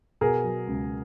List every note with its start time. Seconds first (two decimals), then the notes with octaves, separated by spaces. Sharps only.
0.21 B2 G#4 A#4
0.44 F#3
0.67 C#2